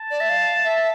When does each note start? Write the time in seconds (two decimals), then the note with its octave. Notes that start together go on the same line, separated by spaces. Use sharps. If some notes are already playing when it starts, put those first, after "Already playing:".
Already playing: A5
0.11 D5
0.21 E5
0.29 F5
0.64 E5